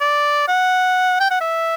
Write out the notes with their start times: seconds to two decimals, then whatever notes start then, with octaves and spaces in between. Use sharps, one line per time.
0.01 D5
0.48 F#5
1.20 G5
1.31 F#5
1.41 E5